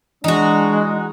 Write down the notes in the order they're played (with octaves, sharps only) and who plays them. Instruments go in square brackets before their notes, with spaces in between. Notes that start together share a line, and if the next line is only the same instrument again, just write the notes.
[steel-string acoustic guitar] E3 [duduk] G#3 [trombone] D4 [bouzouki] D#4 F#4